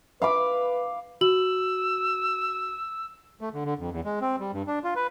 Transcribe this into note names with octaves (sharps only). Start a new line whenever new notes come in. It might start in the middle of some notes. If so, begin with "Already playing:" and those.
B4 F5 B5 D6
F#4 E6 F#7
A3
D3
D3
F2
E2
G#3
C4
G3
G2
D4
F4
B4